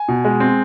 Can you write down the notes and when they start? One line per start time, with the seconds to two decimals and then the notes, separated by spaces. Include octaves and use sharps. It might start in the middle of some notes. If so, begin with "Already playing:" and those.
Already playing: G#5
0.08 B2
0.25 G#3
0.40 C4